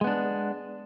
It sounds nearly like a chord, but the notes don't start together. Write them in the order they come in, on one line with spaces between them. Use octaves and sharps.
G#3 B3 D4